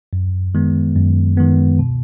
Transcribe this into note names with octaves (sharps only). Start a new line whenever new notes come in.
F#2
D#3 G#3 B3
F#2
D#3 G#3 B3
B2